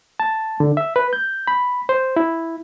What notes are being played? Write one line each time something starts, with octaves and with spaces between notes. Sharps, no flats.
A5
D3
E5
B4
G6
B5
C5
E4